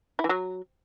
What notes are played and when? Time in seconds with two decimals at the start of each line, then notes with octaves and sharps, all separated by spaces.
0.19 E4
0.24 E3
0.29 F#3